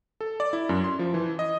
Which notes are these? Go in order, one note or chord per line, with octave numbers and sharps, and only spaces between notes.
A4
D5
E4
F#2
C6
F3
E3
D#5